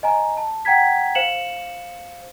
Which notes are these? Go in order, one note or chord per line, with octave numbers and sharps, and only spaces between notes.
D#5 G#5 A#5
A5
F#5 G5 A#5 G#6 B6
C5 F5 C#7 E7 F#7